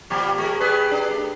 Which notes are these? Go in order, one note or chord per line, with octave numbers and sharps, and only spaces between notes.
A#2 F3 G3
G#3 A#4
G3 G#4 B4
D4
A3